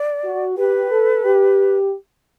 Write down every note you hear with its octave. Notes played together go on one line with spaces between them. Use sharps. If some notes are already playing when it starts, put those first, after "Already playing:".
Already playing: D5
F#4
G4 B4
A4
G4